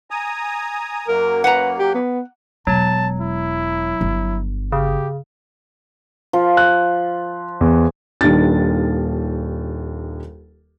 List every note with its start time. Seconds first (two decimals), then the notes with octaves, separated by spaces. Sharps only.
0.11 G#5 A#5 D#6
1.08 F#2 F#3 A#3 A#4
1.44 B4 F#5 A#5
1.79 G4
1.94 B3
2.67 E1 F#3 A5
3.20 E4
4.01 G1
4.72 C#3 G4
6.33 F3
6.57 F#6
7.61 E2
8.21 D#1 D#2 D4 A6